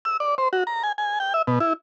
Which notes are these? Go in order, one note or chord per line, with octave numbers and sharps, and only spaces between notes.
E6
D5
C5
F#4
A#5
G#5
G#5
G5
E5
B2
E4